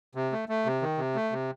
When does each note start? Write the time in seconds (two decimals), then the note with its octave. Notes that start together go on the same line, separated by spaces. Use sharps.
0.15 C3
0.32 A3
0.49 A3
0.66 C3
0.82 D#3
0.98 C3
1.15 A3
1.32 C3